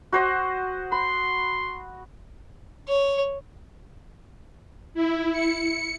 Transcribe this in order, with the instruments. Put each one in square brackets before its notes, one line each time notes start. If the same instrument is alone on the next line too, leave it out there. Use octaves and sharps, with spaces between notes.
[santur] F#4 C5 D#5
[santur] B5 [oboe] C6
[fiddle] C#5
[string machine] E4
C#7